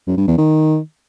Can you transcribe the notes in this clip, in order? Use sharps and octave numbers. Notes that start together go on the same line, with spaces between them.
F#2
G2
E2
D#3